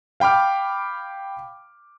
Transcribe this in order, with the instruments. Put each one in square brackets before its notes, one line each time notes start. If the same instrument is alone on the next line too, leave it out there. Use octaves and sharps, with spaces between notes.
[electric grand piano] F5 G5 B5 D6 F6